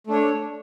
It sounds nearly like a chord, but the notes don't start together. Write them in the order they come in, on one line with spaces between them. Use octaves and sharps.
A3 D4 C#5